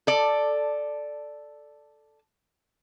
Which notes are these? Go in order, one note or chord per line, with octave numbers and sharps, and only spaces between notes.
A4 D5